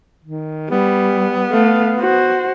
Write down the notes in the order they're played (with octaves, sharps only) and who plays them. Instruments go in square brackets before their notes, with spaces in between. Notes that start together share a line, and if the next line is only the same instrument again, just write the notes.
[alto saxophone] D#3
[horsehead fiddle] G3 [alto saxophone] B3
[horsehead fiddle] A3 F5
F#4 C5